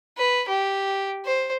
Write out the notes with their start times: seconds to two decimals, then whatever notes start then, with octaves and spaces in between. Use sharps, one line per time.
0.18 B4
0.48 G4
1.25 C5